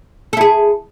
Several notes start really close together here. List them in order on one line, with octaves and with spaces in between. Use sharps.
A4 E4 G#4